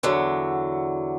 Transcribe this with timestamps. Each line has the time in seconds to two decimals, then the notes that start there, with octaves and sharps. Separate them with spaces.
0.03 E2 D3 F#3